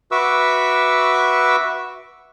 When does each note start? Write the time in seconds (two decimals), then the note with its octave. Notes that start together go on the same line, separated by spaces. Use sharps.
0.11 F#4 B4 E5 C#6 D6 E6